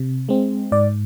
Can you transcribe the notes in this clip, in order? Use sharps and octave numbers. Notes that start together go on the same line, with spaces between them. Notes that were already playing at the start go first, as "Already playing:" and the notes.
Already playing: C3
G#3 C4
G#2 D5